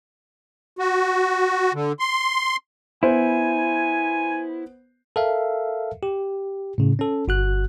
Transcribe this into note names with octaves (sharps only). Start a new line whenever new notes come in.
F#4
D3
C6
B3 E4 C5 G#5
A4 A#4 E5 F5
G4
A2 C#3
C#4 A4
G1 F#4 F#6